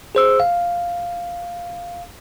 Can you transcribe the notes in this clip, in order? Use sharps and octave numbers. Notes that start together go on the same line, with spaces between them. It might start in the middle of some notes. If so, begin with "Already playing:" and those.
G#4 C5 E6
F5